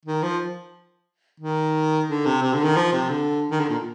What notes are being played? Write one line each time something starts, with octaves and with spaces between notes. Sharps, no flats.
D#3
F3
D#3
D3
C3
C3
D3
D#3
F3
C3
D3
D#3
D3
A#2